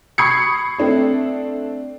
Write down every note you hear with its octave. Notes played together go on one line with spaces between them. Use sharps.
B5 C#6 D#6 G#6 C7 C#7
A3 C4 D4 A4